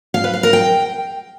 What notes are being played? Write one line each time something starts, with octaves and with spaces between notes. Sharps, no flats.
F5
B4
F5
A#4
G5